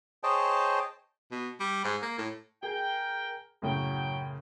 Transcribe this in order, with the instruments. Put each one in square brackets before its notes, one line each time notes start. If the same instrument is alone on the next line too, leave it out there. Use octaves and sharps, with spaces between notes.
[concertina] G#4 C5 C#5 D#5 G5 A5
[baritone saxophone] B2
G3
G#2
A#3
A2
[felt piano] G#4 [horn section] A#4 G5
[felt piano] F#2 A2 C#3 [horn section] F#3 G5